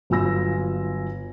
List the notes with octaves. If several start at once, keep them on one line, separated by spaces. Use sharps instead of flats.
G1 F#3 F4 G#5 E6 A#6